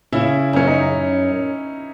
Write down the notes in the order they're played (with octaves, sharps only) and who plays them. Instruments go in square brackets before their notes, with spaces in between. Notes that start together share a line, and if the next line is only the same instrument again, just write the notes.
[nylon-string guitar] C#3 [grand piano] E4
[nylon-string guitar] F#2 [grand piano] C#4
[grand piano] D#4